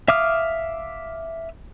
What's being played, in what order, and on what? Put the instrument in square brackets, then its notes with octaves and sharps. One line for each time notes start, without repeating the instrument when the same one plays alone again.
[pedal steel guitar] E5 F5 D6 D#6 F6